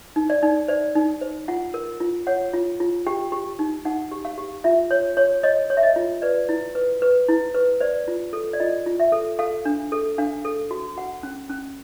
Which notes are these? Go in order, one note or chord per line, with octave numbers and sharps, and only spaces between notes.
D#4
D5
D#4
C5 D5
D#4
C5
F4 F#5
A#4
F4
C#5 F#5
F4
F4
G4 G5
G4
D#4
D#4 F#5
G4
F5
G4
F4 E5
C#5
C#5
C#5 D#5
C#5
E5
D#5
F4
B4 D5
E4
B4
B4
E4
B4
C5 D5
F4
A4
D5
F4 D#5
F4
E5
A4
A4 F5
D4
A4
D4 F5
A4
F#4
F#4 F#5
C#4
C#4